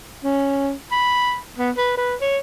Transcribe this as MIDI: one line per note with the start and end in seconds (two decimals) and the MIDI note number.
0.24 0.73 61
0.92 1.38 83
1.58 1.71 59
1.77 1.93 71
1.97 2.16 71
2.21 2.38 73